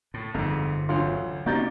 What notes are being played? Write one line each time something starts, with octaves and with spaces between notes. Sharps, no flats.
A2
G1 F2 G#2 C3 A#5
A1 D2 F#3 F4 F6
C3 A#3 C#4 D#4 F#4 D5 G6 A6